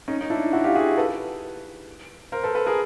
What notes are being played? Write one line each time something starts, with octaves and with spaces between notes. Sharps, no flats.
C#4 D#4
D#4
D4 E4
E4 F#4
F4 G4
F#4 G#4
A4 B4
A#4 C5
A4 B4
A4 B4
G#4 A#4